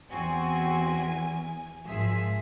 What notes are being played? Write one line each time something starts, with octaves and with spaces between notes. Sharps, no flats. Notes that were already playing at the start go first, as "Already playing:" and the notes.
E2 C4 F#4 G#5
G#1 F3 G#4 E5